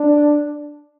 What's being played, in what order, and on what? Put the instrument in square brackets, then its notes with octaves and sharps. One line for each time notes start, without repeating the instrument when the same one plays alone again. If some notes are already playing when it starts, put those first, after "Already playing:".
Already playing: [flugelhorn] D4